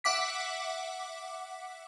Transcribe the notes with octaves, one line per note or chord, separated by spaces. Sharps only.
E5 F#5 D6 B6